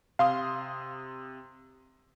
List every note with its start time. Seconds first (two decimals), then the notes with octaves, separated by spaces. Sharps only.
0.19 C3 F5 C6 D#6